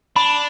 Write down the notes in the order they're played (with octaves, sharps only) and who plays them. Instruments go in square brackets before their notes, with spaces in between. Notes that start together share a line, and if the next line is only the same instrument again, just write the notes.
[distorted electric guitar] D4 [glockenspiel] B5